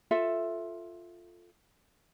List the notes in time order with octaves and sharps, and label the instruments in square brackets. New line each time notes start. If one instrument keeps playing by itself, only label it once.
[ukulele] F4 A4 E5